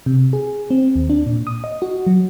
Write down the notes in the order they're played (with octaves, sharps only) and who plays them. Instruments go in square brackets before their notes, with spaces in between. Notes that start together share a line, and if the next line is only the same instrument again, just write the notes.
[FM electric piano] C3
G#4
C4
D#2
D4
A#2
D#6
D#5
F#4
F#3